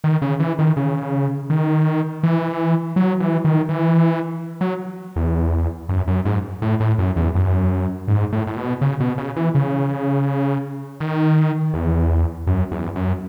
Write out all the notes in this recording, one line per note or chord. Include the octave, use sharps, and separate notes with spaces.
D#3
C#3
E3
D#3
C#3
D#3
E3
F#3
E3
D#3
E3
F#3
E2
F#2
F#2
G#2
A2
A2
F#2
E2
F#2
G#2
A2
A2
B2
C#3
B2
C#3
E3
C#3
D#3
E2
F#2
E2
F#2